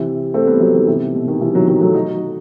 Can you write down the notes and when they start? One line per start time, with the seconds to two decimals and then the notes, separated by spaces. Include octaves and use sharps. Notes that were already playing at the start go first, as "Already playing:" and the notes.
Already playing: C3 E3
0.34 A3 C4
0.47 G3 B3
0.60 F#3 A3
0.74 D#3 F#3
0.87 C3 E3
1.15 B2
1.27 B2 D#3
1.41 C3 E3
1.54 D#3 F#3
1.68 D#3 F#3
1.81 F#3 A3
1.94 D#4 F#4